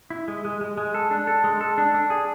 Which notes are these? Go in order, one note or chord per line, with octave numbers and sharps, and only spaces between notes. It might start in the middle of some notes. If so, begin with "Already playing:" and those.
E4
G#3
G#3
G#3
G#3
A4
D4
A4
G#3
A4
D4
D4
G#4